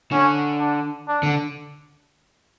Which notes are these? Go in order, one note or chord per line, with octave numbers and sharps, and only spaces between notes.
D3 C#4
D4
D4
D3